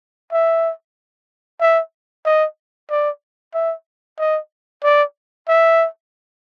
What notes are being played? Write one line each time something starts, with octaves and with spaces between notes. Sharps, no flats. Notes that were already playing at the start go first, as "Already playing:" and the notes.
E5
E5
D#5
D5
E5
D#5
D5
E5